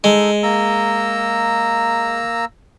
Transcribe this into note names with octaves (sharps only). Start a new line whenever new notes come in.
G#3 D#4 A4
A#3 A#5 E6